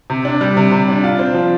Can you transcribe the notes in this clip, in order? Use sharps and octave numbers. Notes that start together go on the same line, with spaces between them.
C3
D4
G3
C3
C3
D4
F4
C4
F3